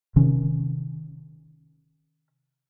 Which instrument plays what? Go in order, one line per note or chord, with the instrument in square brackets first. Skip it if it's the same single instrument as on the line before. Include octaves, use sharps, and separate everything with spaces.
[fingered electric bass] C3 D#3 C#4